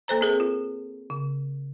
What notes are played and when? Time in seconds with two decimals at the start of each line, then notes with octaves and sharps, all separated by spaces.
0.08 A#3 A4 C5 A#5
0.21 C4 G#4 A#4
0.40 F4
1.10 C#3